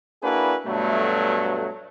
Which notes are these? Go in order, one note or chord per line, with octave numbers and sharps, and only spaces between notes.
A#3 D4 E4 F#4 G#4 B4
G2 B2 F#3 A3